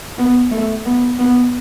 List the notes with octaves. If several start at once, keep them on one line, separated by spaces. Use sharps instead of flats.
B3
A3
B3
B3